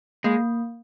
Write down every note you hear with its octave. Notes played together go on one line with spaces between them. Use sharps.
G#3 A#3